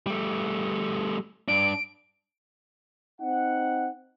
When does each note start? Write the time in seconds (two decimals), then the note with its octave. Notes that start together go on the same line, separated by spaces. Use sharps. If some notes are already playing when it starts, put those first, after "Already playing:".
0.07 G3 A3
1.48 G2 D4 D7
3.20 C4 D#4 F#5